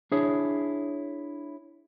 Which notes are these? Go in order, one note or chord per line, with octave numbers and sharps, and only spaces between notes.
D4 E4 G#4 C#5